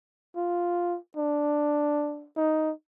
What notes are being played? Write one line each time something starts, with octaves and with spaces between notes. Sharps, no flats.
F4
D4
D#4